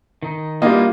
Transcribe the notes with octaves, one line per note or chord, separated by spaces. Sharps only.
D#3 D#4
G3 A#3 B3 D4 E4 F4 D#5